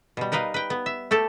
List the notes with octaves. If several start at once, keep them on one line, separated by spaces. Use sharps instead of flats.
B2 G3
D#4 A#4 B4 D#5 F5
B4 G5
B3
E5
A3 G4 A4